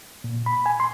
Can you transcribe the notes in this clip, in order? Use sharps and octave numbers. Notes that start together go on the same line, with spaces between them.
A#2
B5
G#5
C6